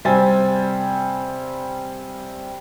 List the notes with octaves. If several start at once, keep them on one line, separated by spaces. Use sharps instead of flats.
C3 G3 C4 G#5 A6